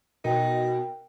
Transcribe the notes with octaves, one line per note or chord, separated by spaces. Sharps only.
B2 D#4 A#4 G5